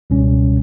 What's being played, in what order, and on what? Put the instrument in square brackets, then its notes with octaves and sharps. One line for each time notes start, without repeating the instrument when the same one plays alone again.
[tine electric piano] C#2 B2 G3 C#4